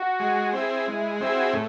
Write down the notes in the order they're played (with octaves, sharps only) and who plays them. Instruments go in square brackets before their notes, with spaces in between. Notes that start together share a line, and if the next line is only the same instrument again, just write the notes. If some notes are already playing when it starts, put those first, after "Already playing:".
Already playing: [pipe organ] F#4
[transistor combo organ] G#3
C4 E4 G#4
[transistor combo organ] G#3 [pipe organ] E4
[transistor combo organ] C4 E4 G#4 [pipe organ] F#4
[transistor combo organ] A2